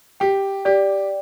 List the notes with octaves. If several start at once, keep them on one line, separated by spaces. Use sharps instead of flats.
G4 G5
G4 D5